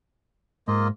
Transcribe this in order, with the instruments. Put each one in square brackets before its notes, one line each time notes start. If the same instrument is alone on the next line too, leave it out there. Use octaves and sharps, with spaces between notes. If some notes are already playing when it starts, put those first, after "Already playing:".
[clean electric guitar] G#2 [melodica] A#3 F4 D#5